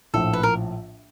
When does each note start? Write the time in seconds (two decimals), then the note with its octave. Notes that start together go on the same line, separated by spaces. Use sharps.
0.14 A#1 A2 F3 A4
0.33 B4
0.43 A#4